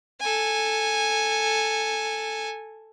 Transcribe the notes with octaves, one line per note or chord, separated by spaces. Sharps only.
A4 G#5